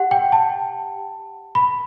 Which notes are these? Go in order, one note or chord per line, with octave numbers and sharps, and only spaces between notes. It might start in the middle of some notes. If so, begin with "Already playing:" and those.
Already playing: G4 F#5
G5
A5
B5